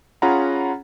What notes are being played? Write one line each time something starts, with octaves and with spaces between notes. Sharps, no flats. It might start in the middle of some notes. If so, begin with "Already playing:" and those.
C#4 F4 G#4 F#5 A#5 B5